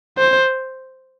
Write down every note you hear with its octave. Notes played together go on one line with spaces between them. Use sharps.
C5